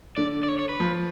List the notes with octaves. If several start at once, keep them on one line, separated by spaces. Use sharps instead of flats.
D3 D5
D5
C#5
C#5
B4
F3